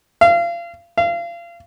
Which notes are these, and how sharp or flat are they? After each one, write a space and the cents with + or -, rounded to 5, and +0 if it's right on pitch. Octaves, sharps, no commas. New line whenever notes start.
F5 -30
F5 -30